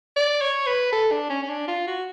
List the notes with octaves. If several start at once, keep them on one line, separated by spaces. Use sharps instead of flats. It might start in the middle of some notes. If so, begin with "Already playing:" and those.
D5
C#5
B4
A4
D4
C#4
C#4
D4
F4
F#4